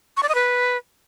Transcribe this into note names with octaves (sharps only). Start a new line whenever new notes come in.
C#6
D5
D#5
B4